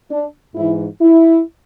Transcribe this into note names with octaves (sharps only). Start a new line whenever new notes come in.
D4
G#2 E3 E4
E4